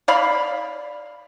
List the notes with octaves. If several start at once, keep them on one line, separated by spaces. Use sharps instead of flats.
D5 F5 B5